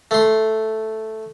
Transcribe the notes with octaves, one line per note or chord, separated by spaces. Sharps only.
A3 C6